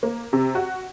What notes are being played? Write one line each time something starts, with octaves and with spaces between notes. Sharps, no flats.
A#3
C3
F#4